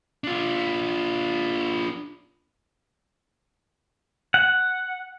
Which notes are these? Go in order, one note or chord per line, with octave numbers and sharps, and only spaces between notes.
D4 F4
F#5